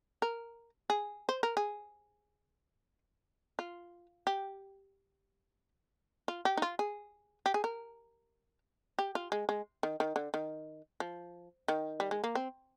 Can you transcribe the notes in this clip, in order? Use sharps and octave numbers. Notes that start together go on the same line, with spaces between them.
A#4
G#4
C5
A#4
G#4
F4
G4
F4
G4
D#4
F4
G#4
G4
G#4
A#4
G4
F4
G#3
G#3
D#3
D#3
D3
D#3
F3
D#3
G3
G#3
A#3
C4